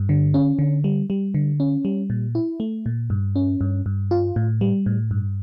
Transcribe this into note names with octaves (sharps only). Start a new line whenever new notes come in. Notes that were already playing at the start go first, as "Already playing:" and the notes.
Already playing: G2
D3
C#4
D3
G3
G3
D3
C#4
G3
A#2
E4
A3
A#2
G2
C#4
G2
G2
F4
A2
G3
A2
G2